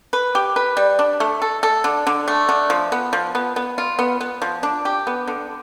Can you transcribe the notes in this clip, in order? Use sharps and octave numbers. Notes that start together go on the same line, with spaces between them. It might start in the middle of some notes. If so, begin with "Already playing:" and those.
B4
G4
B4
G3
D4
A3
A4
A4
D3
D3
A3
D3
F3
B3
F3
B3
B3
F4
B3
B3
F3
D4
G4
B3
D3